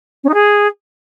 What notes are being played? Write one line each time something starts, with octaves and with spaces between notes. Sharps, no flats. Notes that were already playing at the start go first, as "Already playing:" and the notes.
C#4
D#4
G#4